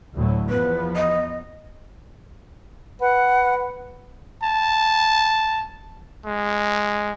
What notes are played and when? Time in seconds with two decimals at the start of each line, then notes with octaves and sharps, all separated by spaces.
0.15 D2 A2 F#3
0.49 E2 F3 B3 B4
0.95 D#5
3.01 B4 F#5
4.43 A5
6.26 G#3